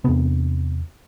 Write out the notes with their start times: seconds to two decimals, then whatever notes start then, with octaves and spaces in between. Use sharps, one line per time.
0.04 E2 C3 B3